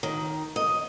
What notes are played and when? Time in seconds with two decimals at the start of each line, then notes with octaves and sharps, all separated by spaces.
0.03 D#3
0.56 D#5